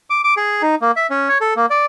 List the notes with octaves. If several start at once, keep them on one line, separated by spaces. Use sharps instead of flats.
D6
D6
G#4
D#4
A#3
E5
C#4
C#5
A4
A#3
D5